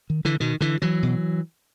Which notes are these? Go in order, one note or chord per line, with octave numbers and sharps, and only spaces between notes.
D#3
D3 E3
B2 D#3
D3 E3
E3 F#3
B2